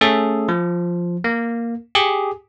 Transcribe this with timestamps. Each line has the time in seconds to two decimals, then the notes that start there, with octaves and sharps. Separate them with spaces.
0.01 A3 C#4 G#4 A4
0.49 F3
1.24 A#3
1.95 G4 G#4